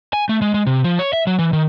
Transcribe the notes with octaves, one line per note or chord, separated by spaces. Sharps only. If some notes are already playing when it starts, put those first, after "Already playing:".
G#5
A3
G#3
G#3
C3
F3
C#5
E5
F#3
E3
D#3